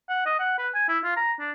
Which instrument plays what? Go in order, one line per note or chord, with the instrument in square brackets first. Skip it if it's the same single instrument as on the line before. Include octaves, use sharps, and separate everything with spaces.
[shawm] F#5
D#5
F#5
B4
G#5
E4
F4
A#5
D4